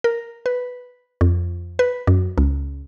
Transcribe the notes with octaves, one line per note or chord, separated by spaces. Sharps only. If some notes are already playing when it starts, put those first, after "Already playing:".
A#4
B4
F2
B4
F#2
C#2